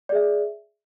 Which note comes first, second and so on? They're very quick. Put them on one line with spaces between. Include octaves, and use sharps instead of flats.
D5 G#4 E5